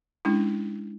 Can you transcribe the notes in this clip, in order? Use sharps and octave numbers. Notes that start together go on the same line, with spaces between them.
G#3 C#4 D4 E4